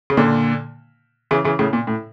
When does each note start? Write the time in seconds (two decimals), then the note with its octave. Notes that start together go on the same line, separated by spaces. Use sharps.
0.10 C#3
0.17 A#2 D3
1.31 C#3 E3
1.45 C#3 E3
1.59 A2 C#3
1.73 A#2
1.87 A2